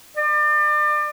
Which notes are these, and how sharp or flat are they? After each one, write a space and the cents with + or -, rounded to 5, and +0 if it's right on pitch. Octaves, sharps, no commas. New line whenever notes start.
D5 +35